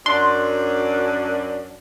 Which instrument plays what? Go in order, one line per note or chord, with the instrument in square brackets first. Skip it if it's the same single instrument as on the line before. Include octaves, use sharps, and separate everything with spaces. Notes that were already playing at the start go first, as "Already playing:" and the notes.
[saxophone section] F#2 D4 [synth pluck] C6